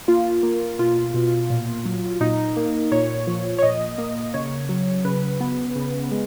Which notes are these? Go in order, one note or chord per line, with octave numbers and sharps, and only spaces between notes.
A#3 F4
A#3
B2 F4
B2
A#2
F#3
A#2 D#4
A#3
A#2 C#5
F3
C#5
A#2 D#5
A#3
C#3 C#5
F#3
C#3 B4
B3
C#3
G#3